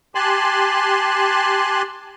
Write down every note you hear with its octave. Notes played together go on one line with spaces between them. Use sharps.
G4 G#5 A5 C6 F#6